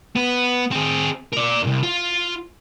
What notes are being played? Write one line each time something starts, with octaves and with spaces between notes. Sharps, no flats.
B3
C4 G#4
A#4 D5
C2 G2
F4